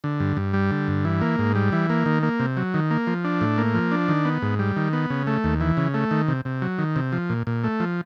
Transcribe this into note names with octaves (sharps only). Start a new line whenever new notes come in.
D3
G2
G2
G3
D3
G2
E3
A#3
G#2
G3
E3
A#3
D#3
A#3
C3
F#3
D#3
A#3
F3
D4
A2
A#3
F3
D4
D#3
B3
G#2
G3
D#3
B3
C#3
A3
D#2
E3
C#3
A3
D#3
C3
C3
F#3
D#3
C3
F3
A#2
A#2
A3
F3